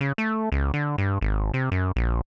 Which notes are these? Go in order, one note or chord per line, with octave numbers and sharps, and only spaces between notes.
C#3
A3
C#2
D3
G2
G#1
C3
F#2
A#1